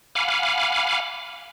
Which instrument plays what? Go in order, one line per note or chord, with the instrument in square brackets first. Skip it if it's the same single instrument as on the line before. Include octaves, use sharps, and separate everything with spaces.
[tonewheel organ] F5 F#5 G#5 B5 D6 F6